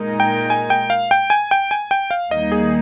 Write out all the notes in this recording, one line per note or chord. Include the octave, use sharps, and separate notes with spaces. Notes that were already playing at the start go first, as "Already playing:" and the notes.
Already playing: A#2 G#3 D#4 A#4
G5
G#5
G5
F5
G5
G#5
G5
G#5
G5
F5
D#2 D#3 G3 A#3 D#4 D#5
G#4